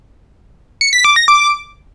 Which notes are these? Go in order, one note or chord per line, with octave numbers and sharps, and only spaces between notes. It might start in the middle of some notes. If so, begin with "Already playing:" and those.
C#7
B6
D6
A#6
D6